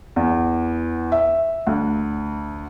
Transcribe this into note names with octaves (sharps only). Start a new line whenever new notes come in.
E2
E5
D2